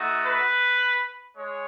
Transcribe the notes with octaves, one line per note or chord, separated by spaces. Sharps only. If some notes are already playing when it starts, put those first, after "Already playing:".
Already playing: A3 D#4 F#4
B4
G#3 C#5